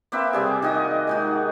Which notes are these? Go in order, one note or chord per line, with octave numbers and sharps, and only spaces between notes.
A#3 C4 B4 E5
C3 G3 G#4
D#3 F#4 D#5
G#3 D#4 F#4